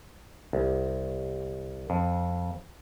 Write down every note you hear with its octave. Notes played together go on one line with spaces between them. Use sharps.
C2
F2